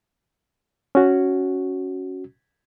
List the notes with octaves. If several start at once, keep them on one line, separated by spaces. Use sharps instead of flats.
C#4 F#4